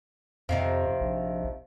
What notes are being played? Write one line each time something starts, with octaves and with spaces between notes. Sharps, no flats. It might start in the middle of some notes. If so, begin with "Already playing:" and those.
F2 C3 D#3 F3
A#1